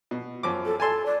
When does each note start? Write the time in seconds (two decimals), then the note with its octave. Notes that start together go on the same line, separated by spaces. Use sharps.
0.11 B2
0.43 F#2 F3 D6
0.65 A4
0.80 A4 G#5 A5 C6
1.06 D5